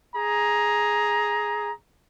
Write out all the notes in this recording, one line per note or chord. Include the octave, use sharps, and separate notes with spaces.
G#4 A#5